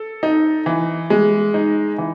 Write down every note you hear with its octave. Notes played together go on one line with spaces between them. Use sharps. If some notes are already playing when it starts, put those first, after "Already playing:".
Already playing: A4
D#4
E3
G#3
D#4
E3